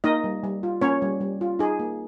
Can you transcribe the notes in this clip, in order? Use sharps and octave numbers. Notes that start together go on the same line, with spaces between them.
A#3 D#4 D#5
G3
G3
F4
A#3 C#4 C#5
G3
G3
F4
D#4 G#4
A#3